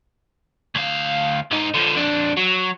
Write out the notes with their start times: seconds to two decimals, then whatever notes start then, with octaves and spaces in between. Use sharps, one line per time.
0.75 D2 F5
1.51 G#2 D#4
1.74 D3 F3
1.95 F2 D4
2.37 F#3